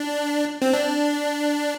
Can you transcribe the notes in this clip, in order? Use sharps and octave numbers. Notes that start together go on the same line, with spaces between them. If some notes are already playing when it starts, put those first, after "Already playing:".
Already playing: D4
C4
D4